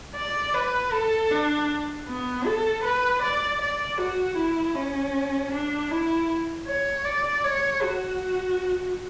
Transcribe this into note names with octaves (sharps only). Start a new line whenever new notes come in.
D5
B4
A4
D4
B3
A4
B4
D5
D5
F#4
E4
C#4
D4
E4
C#5
D5
C#5
F#4